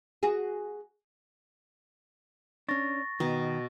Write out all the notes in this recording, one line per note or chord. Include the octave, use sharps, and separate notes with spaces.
F#4 G#4
C#4 D4 C#6 A6 A#6
B2 D#3